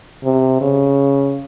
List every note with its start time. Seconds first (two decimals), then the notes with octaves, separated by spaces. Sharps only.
0.24 C3
0.61 C#3